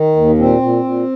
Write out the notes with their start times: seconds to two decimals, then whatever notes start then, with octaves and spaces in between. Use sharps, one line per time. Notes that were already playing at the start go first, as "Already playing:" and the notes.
Already playing: D#3
0.16 D#2
0.38 A#2 C4
0.62 A#2
0.84 A#2